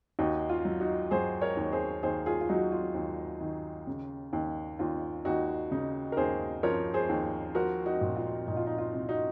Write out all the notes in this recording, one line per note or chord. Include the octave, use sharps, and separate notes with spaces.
D#2 D#4 F#4
F4
F#3
D#4 F#4
F#3 G#4 C5
A#4 C#5
D#2
G#4 C5
D#2 G#4 C5
F4 G#4
F4
F#3 D#4 F#4
F4
D#2
D#3
C#3
D#2
D#2 F4
D#2 D#4 F#4
C#3 D#4
A#4
D#2 G#4 C5
F3 A#4 C#5
G#4 C5
D#2
F3 F#4 A#4
D#4 F#4
A#2
F4
A#2 D#4
F4
D#4
F4
C2
D#4 F#4